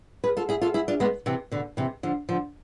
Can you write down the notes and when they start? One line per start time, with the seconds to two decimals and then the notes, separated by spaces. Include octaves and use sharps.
0.24 G#4 B4
0.37 F4 A4
0.49 E4 G#4
0.61 F4 A4
0.74 E4 G#4
0.88 D4 F4
1.00 G#3 B3
1.26 C3 E3
1.52 B2 D3
1.77 C3 E3
2.03 D3 F3
2.29 D3 F3